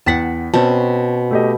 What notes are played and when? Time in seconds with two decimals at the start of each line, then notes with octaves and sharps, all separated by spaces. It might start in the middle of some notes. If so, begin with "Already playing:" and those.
0.06 E2 F#5 G5 A5 B6
0.54 B2 C4 C#4 A5
1.31 A3 G4 D#5